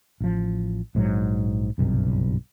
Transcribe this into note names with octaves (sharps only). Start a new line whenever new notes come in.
A1 F3
A#1 G#2 D3 F#3
F#1 B1 G2 C3